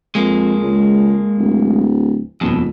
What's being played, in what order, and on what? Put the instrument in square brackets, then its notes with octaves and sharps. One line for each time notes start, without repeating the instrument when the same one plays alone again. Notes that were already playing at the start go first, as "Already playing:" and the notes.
[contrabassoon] F2 [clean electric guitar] G#3 A#3
[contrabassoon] C#2
D1
[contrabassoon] D#1 [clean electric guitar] F2 B2